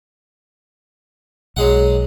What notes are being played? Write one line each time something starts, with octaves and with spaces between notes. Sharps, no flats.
B1 F#3 G#3 F#5